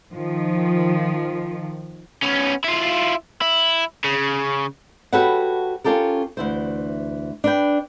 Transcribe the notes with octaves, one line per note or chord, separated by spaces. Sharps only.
D#3 F3
B3 C#4
E4 F4
E4
C#3
F#4 G4 A4 B4 C#5 F#5
C#4 F4 G4 A4 A#4
D2 E3 C5
D4 B4 G5